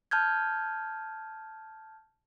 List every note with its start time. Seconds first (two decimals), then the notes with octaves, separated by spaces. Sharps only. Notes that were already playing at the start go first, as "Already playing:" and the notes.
0.11 A5 F6 G6 G#6